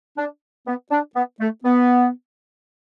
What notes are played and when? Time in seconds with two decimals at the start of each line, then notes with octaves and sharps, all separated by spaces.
0.18 D4
0.67 B3
0.91 D4
1.15 B3
1.40 A3
1.64 B3